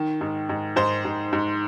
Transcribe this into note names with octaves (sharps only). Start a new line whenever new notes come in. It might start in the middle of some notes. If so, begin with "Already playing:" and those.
Already playing: D#3
G#2
G#2
G#2 C5
G#2
G#2